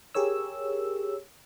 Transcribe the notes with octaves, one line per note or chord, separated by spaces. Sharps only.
G4 G#4 A#4 C#5 E6